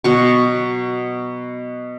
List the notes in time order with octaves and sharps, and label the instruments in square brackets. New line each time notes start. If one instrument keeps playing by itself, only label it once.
[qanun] B2 F#3 C#6